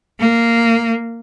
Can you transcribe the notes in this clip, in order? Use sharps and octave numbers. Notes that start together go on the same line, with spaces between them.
A#3